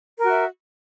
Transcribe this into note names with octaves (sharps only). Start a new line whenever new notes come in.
F#4 A#4 E5